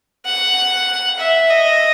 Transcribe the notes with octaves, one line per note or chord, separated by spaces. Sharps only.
F#5
E5
D#5